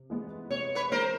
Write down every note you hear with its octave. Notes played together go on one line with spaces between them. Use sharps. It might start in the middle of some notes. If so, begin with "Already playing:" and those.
Already playing: C3
E3 G#3 B3
C3 C#5
B4 C#5
E3 G#3 B3 A#4 C5